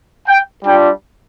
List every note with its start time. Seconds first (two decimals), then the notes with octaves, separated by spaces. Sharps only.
0.28 G5
0.64 G3 D4 F4 G5